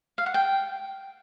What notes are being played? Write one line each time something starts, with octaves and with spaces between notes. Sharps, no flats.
F5
F#5
G5